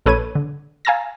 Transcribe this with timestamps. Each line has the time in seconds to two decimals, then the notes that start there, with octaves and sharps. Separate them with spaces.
0.06 A#1 A4 B4 C#5 G#6 D#7
0.35 D3
0.85 F5 G#5 A#5 E6 A6 A#6